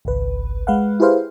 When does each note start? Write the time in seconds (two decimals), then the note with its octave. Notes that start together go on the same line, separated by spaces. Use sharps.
0.05 G#1 C#2 B4
0.67 G#3 B4 F5 F#5
1.00 E4 G4 G#4 B4 C5 F5